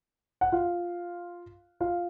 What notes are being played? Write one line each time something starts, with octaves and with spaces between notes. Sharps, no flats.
F#5
F4 F5
F4 F5